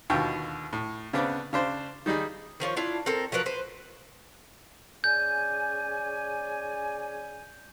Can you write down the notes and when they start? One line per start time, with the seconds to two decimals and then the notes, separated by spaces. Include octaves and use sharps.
0.10 D#2 B2 D3 F4 G5 C#6
0.73 A2
1.13 C#3 B3 C4 D4 D6
1.53 C#3 D4 C5
2.06 D#3 G3 D#4 G#4
2.60 D#3 F3 F4 C#5
2.76 D4 E4 F4
3.06 C4 A4 A#4
3.32 F3 F#3 A#4 B4
3.46 B4 C5
5.04 C#3 D5 G#5 G6